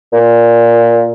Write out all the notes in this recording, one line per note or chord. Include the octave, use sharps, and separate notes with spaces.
A#2